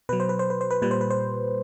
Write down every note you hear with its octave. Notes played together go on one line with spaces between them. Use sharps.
B2 F#3 B4
C5
B4
C5
B4
C5
B4
A#2 G3 B4
C5
B4
C5